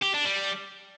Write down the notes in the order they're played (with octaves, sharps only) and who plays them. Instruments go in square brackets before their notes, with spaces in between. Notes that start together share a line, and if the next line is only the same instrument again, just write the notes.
[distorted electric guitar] G4
D4
G3